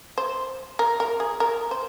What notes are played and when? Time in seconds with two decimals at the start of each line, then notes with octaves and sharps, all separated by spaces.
0.18 C5
0.79 A#4
1.00 A#4
1.20 G#4
1.40 A#4
1.71 C5